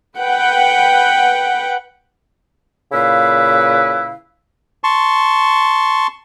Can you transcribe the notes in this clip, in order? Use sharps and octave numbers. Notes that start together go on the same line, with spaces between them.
B4 F#5 G5
A#2 C#3 E4 B4 F5
A5 C6 C#6